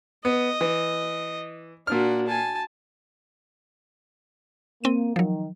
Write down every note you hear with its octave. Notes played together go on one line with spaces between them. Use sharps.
B3 D#5
E3
A#2 D4 F#4 F6
G#5 A5
A#3 C4 D#7
D#3 F3 F#3